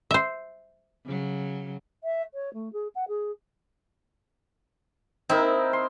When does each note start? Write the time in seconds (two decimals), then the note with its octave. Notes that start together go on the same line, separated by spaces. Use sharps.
0.11 C5 E5
1.05 C#3 F#3
2.03 E5
2.34 C#5
2.53 A3
2.73 G#4
2.95 F#5
3.08 G#4
5.29 C4 D#4 E4 A#4
5.73 C6